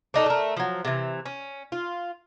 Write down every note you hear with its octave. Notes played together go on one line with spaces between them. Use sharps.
D4 D#4 A4
A3 A#4
F3 F#3
C3 E3
C#4
F4